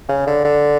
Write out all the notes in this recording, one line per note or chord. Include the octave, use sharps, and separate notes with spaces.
C#3
D3
D3